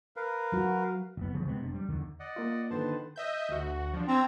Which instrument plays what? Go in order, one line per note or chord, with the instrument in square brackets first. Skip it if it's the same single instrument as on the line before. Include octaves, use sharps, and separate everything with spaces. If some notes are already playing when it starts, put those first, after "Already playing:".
[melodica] A#4 B4 F5
[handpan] F#3 F#4
[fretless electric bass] F#1 B3
D#1 D2 C#3 F3
C3 G#3 B3 C4
F1 C3 D4
G3
E2 D3 D#3
[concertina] D5 D#5 F#5
[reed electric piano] A#3 F4
[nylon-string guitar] D3 D#3 [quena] B4 [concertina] C5 A5
[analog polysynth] D#5 E5 G6
D2 F#4
F3 D4
[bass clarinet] C4 [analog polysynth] A#5 E6 G#6